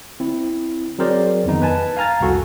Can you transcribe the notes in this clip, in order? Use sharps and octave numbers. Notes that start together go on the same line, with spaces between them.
C4 E4
F#3 C4 G#4 A#4 C5 D5
F2 D#3 B3 D#4
B4 G#5 A5
F5 G#5 A#5 F6 A6
C2 F2 F#4 A4